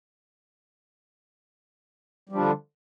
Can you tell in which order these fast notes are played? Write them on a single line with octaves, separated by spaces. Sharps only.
G3 F3 D4 D3